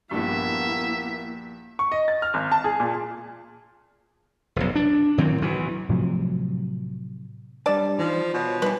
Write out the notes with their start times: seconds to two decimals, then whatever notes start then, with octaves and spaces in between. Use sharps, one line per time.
0.11 A#1 G2 A#3 B3 E4 E5
1.79 C#6
1.92 D#5
2.08 A6
2.22 F6
2.34 G#1
2.52 A5
2.64 G#4
2.80 A#2
4.56 F1 B1
4.75 D4
5.18 A2 D#3 F#3 C4
5.42 B1 E3
5.89 A2 C3 F3 F#3
7.66 G3 D4 D5 A5
7.99 E3 F3 D#4
8.34 B2 F4 C#5
8.62 E3 G3 B4